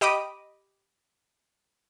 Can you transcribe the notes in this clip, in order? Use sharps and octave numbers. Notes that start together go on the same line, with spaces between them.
G4 D#5 B5 D6 D#6